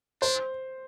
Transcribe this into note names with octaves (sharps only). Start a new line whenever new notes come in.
D4 C5